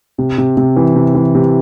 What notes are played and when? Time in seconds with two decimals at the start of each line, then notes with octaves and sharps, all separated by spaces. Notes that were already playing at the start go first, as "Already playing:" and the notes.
0.18 C3
0.38 C3
0.57 C3
0.76 E3
0.95 C3
1.15 E3
1.35 C3